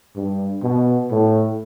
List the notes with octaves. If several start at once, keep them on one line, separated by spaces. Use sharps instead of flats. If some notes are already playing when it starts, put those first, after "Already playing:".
G2
B2
A2